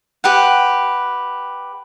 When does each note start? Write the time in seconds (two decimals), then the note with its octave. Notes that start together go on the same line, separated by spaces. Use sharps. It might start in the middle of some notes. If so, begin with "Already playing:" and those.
0.24 G4 B4 F#5